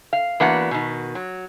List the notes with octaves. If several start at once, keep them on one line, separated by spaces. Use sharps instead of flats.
F5
E3 A#3 B3 D4 F#4 F#5
B2 D#3
F#3